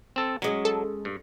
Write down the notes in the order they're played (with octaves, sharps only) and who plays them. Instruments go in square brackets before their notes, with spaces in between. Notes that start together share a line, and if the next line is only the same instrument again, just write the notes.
[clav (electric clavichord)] C4 A4
[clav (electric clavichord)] F#3 [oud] G#3 C#4
[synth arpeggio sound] A4
[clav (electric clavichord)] G2